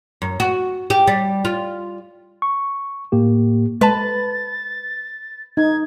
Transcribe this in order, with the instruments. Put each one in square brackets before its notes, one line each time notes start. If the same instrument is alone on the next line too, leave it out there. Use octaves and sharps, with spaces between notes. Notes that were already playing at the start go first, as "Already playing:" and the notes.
[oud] F#2
F#4
G4
G3
F4
[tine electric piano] C#6
A2 A#3 G4
[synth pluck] G#3 A5 [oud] B4 [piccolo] A6
[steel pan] D#4 [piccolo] G#6